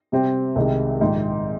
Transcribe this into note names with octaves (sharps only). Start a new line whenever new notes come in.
C3 G3 C4 G4
C2 C3 D#3 G#3
A#1 G#2 D#3